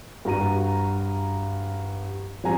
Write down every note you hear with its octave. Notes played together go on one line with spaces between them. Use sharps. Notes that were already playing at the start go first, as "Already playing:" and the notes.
G2 F#4 A#5 D#7
F2 G3 G#5 A#5